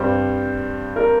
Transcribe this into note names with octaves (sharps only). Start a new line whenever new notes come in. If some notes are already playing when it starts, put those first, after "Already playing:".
Already playing: G2 G3 C4 C5
A#4